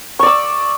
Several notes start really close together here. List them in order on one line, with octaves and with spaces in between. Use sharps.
C#6 D5 E6